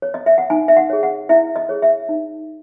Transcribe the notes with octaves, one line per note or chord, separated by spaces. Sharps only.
C#5
D#5
E5
F#5
D#4 G#5
E5
F#5
G#4 C#5
F#5
E4 E5
D#5
G#4 C#5
E5
D#4